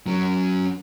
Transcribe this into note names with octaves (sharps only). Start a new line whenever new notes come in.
F#3 C#4